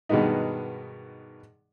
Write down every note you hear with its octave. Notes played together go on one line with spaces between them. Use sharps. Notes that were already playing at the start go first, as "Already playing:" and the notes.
G2 B2 D#3 G#3 B3 D#4